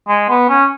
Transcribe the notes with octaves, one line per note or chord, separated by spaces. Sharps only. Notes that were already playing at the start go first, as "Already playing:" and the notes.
G#3
B3
C#4